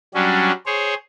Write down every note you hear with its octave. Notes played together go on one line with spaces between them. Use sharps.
F#3 G3 C#4 D4
G#4 C5 C#5